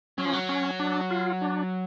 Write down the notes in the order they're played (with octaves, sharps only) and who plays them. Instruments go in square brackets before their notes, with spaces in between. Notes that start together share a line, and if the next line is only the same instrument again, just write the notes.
[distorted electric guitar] F#3 [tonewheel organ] C#4
[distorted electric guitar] F3
F#3
[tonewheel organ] C#4
D4
F4
D4